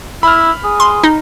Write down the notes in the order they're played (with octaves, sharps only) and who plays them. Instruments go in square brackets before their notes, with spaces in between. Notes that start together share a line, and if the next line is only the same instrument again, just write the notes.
[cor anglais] E4 [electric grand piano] B5 F6
[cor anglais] G#4
[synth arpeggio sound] C6
D#4